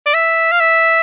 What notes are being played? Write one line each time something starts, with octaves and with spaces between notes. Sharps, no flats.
D5
E5
F5
E5